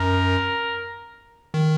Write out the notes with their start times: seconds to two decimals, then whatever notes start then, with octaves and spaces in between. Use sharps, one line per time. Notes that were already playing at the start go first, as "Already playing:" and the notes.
Already playing: F#2 A#4
1.54 D#3